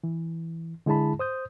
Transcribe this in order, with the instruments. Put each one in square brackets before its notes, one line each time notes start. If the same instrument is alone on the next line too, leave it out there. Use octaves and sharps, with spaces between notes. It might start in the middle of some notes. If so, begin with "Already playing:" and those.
[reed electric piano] E3
D3 G#3 E4 G#4 A5 B5
C5 D#6 G6